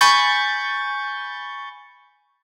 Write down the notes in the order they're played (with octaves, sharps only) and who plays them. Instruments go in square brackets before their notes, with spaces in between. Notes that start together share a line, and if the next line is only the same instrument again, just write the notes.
[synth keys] G#5 B5 C#6 G6 A6